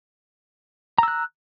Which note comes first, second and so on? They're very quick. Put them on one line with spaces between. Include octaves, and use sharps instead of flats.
A#5 E6 F#6